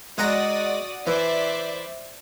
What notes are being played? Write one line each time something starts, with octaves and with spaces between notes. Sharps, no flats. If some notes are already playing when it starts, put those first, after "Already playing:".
G#3 F#4 D5 F#5 A#5 D#6
E3 C5 D5 E5